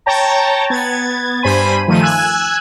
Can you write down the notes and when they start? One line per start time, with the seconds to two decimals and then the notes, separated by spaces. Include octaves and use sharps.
0.06 C#5 G5 A5 A#5
0.70 B3 G#6 A6
1.43 G2 C5 G#5 B5 D#7
1.88 D#3 F3 A3 D#7
2.01 G#5 E6 F#6 G#6